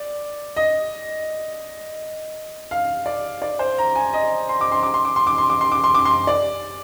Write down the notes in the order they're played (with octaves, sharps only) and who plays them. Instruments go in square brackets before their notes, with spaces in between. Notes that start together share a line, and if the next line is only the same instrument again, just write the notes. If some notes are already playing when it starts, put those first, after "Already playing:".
Already playing: [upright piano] D5
D#5
F5
D5
D5
C5
A#5
G#5
D#5
C6
D6
C6
D6
C6
D6
C6
D6
C6
D6
C6
D6
C6
D6
C6
D5